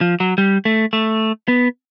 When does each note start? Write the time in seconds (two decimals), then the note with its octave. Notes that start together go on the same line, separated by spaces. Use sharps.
0.01 F3
0.20 F#3
0.38 G3
0.65 A3
0.93 A3
1.48 B3